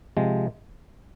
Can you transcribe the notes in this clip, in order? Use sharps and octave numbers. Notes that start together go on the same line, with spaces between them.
C3 F3 G#3